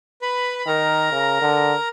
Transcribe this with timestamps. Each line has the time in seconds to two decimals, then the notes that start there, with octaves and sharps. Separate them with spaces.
0.22 B4 B5
0.59 B5
0.67 D#3 A#4 A#5
1.12 C#3
1.42 D3